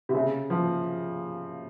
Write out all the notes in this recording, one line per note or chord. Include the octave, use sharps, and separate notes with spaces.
C3
C#3
F3